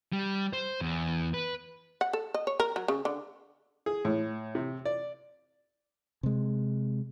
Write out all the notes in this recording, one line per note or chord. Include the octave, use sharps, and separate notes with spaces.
G3
C5
E2
B4
F#5
A4
D#5
C#5
A#4
F#3
C#3
D3
G#4
A2
C3
D5
C3 G#3